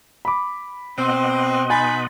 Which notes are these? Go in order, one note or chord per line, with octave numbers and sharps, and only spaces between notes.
B5 D6
B2 C4 D#5 F#5 C6
D#4 G#5 B5 A6